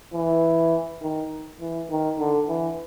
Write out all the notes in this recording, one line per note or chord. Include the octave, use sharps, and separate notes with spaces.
E3
D#3
E3
D#3
D3
E3